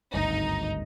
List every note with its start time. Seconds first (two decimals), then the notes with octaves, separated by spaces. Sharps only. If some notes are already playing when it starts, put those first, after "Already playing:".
0.14 G#1 D2 G2 D#4